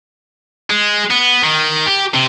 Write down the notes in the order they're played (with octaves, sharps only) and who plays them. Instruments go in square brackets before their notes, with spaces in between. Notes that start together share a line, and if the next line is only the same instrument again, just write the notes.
[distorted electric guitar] G#3
B3
D#3
G4
C3